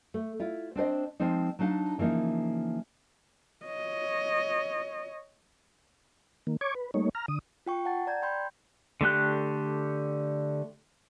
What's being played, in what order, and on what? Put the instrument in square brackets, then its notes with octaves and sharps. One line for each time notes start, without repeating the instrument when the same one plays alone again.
[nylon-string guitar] A3
E4 F4
C4 D4 C5 D#5
F3 G#3 C4 D#4
F#3 D4 D#4 F5 A5
C#3 E3 F3 A#3 D#4
[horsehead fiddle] C#5 D#5
[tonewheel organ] D#3 A#3
C#5 C#6 D6 G#6
B4
G3 A3 A#3 D#4 C#5
A#5 F6
D3 D#6
[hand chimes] F4 G5 C#6
F#5 A5 A6
D5 A#5 G6 G#6
G5 B5 C6 G6
[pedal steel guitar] D3 A3 G4 F#6